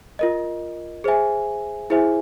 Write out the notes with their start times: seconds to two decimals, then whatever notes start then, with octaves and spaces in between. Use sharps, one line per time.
0.19 F4 A#4 D#5
1.04 G#4 C5 E5 G#5
1.90 E4 G#4 C5 E5 G#5